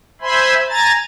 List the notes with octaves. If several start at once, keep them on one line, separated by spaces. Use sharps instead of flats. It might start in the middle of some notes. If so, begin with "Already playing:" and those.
C5 E5 G#5 B5 C6
G#5 A#5 A6